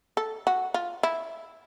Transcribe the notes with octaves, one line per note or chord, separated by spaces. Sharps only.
A4
F#4
F4
E4